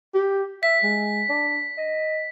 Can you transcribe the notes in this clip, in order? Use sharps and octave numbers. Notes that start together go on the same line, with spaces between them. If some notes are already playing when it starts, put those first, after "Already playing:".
G4
E5 B6
G#3
D4
D#5